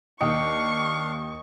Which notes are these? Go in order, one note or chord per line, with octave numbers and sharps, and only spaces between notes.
D#2 D4 D#5 F5 G5 C#6 C#7